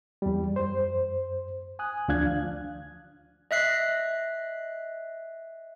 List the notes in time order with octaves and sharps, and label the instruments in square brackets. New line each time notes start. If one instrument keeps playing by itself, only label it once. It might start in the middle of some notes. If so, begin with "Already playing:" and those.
[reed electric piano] E2 G3
F#2 C5
G#5 D#6 F#6
D2 F3 D4 F5 F#6 G#6
[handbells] D#5 E5 F#6 C7